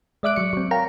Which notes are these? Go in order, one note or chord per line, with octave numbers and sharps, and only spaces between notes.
G#3 D5 E5 D6 F#6 D7
F#3 C#7
F#3 C4
A#4 C#5 F5 G5 A#5